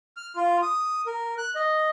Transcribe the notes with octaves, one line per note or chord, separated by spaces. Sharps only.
F6
F4
D#6
A#4
F#6
D#5